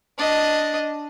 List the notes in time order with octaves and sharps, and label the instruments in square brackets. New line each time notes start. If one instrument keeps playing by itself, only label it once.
[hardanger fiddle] D4 D#5